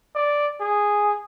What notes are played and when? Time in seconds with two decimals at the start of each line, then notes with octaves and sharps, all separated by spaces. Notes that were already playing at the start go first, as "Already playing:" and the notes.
0.15 D5
0.61 G#4